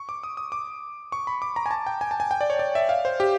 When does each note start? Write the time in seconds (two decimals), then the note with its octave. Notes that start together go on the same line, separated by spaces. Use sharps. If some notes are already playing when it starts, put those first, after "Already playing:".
Already playing: C#6
0.09 D6
0.23 D#6
0.37 D#6
0.52 D6
1.12 C#6
1.27 B5
1.42 D6
1.56 A#5
1.66 G#5
1.71 A5
1.86 G5
2.01 G#5
2.11 A5
2.20 G#5
2.31 G5
2.41 D5
2.50 C#5
2.59 D5
2.75 E5
2.89 F5
3.05 C5
3.20 G4